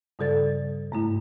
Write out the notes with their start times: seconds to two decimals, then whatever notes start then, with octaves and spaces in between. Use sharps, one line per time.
0.19 G2 C#3 G3 A4 D5 A6
0.92 G#2 A3 E4